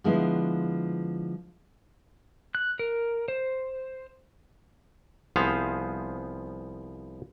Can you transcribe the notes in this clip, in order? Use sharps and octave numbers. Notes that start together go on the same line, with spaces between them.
D3 F3 G#3 B3 E4
F#6
A#4
C5
C2 F3 B3 G#4 C5 F5